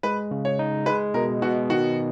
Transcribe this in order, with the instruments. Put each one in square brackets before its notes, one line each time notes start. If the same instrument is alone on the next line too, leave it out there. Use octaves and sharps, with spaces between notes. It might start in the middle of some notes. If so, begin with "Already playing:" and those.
[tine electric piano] G#3 [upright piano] B4
[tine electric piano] C#3
[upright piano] C#5
[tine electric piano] D#4
[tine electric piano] G#3 [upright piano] B4
[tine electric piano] B2 [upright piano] A#4
[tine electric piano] B2 [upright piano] F#4
[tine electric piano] D#3 [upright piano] F#4